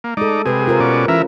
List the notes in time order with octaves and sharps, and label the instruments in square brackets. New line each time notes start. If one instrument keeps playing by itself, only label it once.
[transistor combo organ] A#3
[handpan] G#3 A4 [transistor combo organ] D#4 D5
[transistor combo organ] C3 G#4 [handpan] G4 B4
[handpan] F4 A#4 C5
[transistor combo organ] B2 C#4 D5
[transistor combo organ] E3 A#4 E5 [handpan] C#4 F4